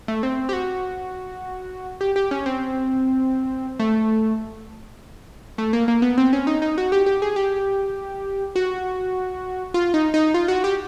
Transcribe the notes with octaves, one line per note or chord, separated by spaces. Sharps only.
A3
C4
G4
F#4
G4
G4
C#4
C4
A3
A3
A#3
A#3
B3
C4
C#4
D#4
D#4
F#4
G4
G4
G#4
G4
F#4
F4
D#4
D#4
F4
F#4
G4